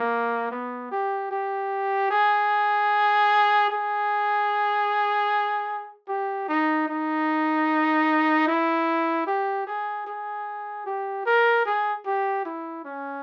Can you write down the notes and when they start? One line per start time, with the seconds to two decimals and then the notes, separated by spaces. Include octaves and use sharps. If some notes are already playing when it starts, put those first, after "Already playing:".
Already playing: A#3
0.51 B3
0.91 G4
1.31 G4
2.11 G#4
3.70 G#4
6.08 G4
6.49 D#4
6.88 D#4
8.48 E4
9.27 G4
9.67 G#4
10.07 G#4
10.86 G4
11.26 A#4
11.66 G#4
12.06 G4
12.45 E4
12.85 C#4